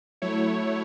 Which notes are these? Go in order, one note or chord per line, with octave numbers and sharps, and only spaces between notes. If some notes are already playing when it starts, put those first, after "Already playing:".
F#3 A3 E4 C#5